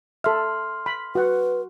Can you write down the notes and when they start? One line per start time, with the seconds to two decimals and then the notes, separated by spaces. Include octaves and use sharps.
0.24 A4 E5 C6 F6
0.86 B5
1.15 F#4 B4 F#5